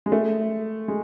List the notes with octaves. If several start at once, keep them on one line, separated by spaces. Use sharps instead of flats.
G#3
A3
G#3